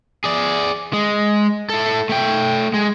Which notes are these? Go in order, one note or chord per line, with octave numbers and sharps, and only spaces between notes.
G#4 D5
G#3
E4 A4
A3 G5
G#3